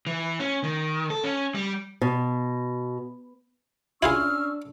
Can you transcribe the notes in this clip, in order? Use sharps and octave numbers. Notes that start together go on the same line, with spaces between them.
E3
C#4
D#3
A4
C#4
G3
B2
C#4 D4 E4 F4 G#4 C#6 E6 F6